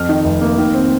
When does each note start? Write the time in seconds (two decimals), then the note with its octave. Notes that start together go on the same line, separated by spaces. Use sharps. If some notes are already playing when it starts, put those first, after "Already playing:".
Already playing: F2 F6
0.09 D#3
0.24 F1
0.42 A#3
0.58 D#3
0.74 C4